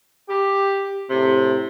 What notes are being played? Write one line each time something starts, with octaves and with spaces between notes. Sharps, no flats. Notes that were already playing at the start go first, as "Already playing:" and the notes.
G4
A2 C3